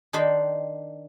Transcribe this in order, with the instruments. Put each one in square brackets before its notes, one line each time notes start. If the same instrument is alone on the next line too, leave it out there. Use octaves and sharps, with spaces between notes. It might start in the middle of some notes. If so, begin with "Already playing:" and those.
[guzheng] D#3 D4 D#4 C5 G5 B5